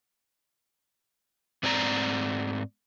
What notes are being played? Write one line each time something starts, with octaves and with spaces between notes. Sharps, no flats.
G#2 C4 D5 G#5 A#5